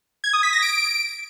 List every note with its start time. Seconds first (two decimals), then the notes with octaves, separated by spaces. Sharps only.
0.24 G#6
0.33 D#6
0.43 B6
0.53 A#6
0.62 D7